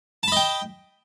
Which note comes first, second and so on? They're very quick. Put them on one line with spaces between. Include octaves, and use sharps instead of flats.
A5 B5 D#5 G5